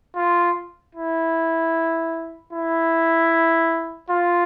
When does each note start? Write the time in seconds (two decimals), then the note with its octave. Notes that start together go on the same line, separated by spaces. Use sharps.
0.16 F4
0.95 E4
2.53 E4
4.10 F4